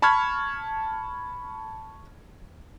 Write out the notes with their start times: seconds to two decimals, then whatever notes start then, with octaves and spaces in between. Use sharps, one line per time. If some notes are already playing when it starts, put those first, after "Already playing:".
0.02 A5 B5 C#6 F6 G#6